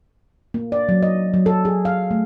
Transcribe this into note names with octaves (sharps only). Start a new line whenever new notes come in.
A#3
D5
F#3
D#5
F#3
A4
G#4
F5
A3